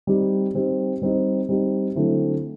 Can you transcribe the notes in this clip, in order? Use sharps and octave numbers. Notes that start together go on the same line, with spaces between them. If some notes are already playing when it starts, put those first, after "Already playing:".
G3 C4 D#4 G4
G3 C4 D#4 G4
G3 C4 D#4 G4
G3 C4 D#4 G4
D3 F#3 A3 C4 E4